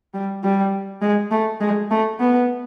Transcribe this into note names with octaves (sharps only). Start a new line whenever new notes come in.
G3
G3
G#3
A3
G#3
A3
B3